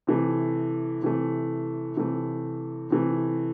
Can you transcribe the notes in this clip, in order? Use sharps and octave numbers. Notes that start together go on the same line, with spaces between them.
C3 E3 A3
C3 E3 A3
C3 E3 A3
C3 E3 A3